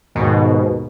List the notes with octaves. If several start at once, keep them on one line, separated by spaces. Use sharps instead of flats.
D#2 G#2 B2 D#3